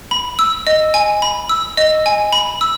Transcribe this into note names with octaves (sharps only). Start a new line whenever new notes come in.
B5
E6
D#5
G#5
B5
E6
D#5
G#5
B5
E6